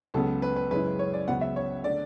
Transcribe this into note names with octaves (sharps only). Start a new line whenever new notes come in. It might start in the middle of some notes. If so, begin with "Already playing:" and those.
C#2 C#3 F#3 B3 A4
B4
B4
F#2 C#3 G#3 C#4 E4 B4
C#5
D5
C#2 C#3 F#3 B3 F#5
E5
C#5
D3 A3 D5